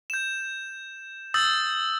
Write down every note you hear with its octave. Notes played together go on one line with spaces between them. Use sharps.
G6 E7
D#6 E6 G6 A6